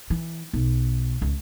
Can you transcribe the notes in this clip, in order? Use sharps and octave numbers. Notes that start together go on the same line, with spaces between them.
E3
B1
C#2